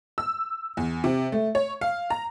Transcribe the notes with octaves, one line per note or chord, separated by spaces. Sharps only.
E6
E2
C3
A3
C#5
F5
A#5